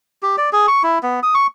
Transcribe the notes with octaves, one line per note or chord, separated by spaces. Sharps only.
G4
D5
G#4
C#6
E4
B3
D#6
C#6